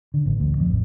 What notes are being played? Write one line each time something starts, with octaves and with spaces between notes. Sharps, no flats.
D3
A1
D2
F2
A1